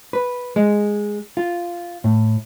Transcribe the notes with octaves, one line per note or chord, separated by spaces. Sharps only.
B4
G#3
F4
A2